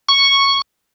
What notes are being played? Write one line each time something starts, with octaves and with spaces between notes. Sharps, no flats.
C#6